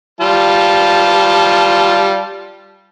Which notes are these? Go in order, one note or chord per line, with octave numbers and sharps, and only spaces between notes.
G3 F4 A5